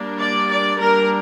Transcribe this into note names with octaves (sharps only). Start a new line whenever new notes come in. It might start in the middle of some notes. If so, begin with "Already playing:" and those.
Already playing: G3 A#3 D4
D5
D5
G3 A#3 D4 A#4